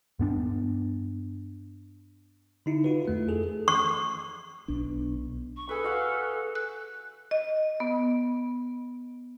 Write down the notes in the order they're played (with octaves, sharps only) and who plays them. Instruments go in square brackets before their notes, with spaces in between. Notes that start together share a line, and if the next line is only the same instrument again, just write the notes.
[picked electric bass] G2 B3 D4
[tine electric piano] D3 D#4 E4
F4 F#4 B4
F2 A3
G#4 A4
[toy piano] C#6
[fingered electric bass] B1 B2 D4
[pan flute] C#6
[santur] G#4 B4 [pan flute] A4
[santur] F#4 F5 F#5
[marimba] F#6
D#5
B3